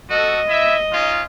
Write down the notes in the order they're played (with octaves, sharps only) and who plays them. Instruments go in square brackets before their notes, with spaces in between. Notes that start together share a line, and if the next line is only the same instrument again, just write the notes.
[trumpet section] F#4 A4 [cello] D#5
[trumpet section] E4 E5
C#4 D#4 F4